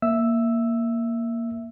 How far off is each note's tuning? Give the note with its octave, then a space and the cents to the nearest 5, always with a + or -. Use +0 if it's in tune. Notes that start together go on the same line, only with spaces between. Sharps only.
A#3 +0 E5 +0 E6 +0